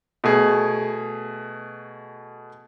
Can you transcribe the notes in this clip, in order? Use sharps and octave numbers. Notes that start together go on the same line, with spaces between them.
B2 A3 G#4